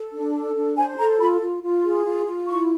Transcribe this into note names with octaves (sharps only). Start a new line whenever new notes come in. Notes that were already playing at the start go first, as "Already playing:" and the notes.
Already playing: A4
D4
A4
D4
C5 G#5
A4 A#5
F4 B5
F4
F4
G#4
F4
F4
E4 C#6